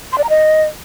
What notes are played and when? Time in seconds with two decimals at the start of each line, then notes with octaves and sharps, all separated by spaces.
0.12 C6
0.18 D5
0.24 A#5
0.29 D#5